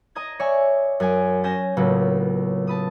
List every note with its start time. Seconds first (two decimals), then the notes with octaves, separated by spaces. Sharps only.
0.15 D#5 A#5 D#6 G#6
0.39 C#5 D5 E5 G#5 C#6
1.00 F#2 G#5 D7
1.44 C#4 G#5 G6 A#6 E7
1.77 C#2 A2 C#3 F#3 A#3 B3
2.67 A5 B5 D#6